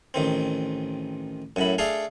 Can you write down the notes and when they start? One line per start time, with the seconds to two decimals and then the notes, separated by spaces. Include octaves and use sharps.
0.14 A1 D#3 C4
1.56 F#2 A2 B5
1.78 A3 D4 G#4 A4 F5